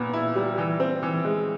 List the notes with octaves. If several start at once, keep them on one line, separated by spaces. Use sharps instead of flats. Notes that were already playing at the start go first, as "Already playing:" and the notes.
Already playing: A#2 B3
E4
G3
E3
C4
E3
G#3